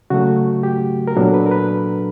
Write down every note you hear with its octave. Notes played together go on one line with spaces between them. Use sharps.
C#3 F#3 A3 F#4
G4
A#4
A#2 F#3 B3 D4 A4
B4
A#4
B4